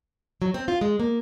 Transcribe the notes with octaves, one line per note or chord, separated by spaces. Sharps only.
F#3
C4
F4
G#3
A#3